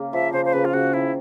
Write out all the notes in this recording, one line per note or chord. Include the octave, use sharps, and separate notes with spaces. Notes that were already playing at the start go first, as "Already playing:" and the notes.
Already playing: C#3 A#3
F3 E5
C#3 C5
C5
C#3 B4
F4
C#3 F#4
D#3 E4